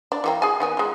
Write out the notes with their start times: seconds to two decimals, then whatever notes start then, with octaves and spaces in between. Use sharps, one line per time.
0.12 D4
0.24 E3 A#3 G5
0.42 G#4 G#5
0.60 D#3 B3 G#5
0.77 G#3 F4